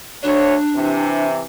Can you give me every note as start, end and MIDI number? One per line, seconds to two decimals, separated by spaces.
0.23 0.55 38
0.23 1.26 62
0.23 0.55 73
0.75 1.43 48
0.75 1.43 52